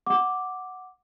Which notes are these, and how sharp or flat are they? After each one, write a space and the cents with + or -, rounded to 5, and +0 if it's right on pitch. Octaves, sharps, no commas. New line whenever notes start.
F#5 +0 D6 +0